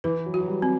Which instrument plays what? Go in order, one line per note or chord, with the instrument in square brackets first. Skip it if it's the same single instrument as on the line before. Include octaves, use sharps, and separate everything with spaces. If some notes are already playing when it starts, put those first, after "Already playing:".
[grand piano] E3 [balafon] B4
[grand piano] F#3
[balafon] F#4
[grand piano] F#3
G3
[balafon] C4